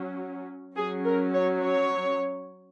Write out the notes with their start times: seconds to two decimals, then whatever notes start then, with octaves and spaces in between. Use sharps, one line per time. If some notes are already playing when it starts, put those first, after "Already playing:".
Already playing: F#3 C#4
0.77 F#3 C#4 G#4
1.05 A#4
1.34 C#5
1.62 C#5